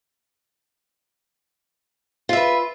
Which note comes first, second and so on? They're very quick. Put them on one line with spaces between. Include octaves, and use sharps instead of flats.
F4 E5 B4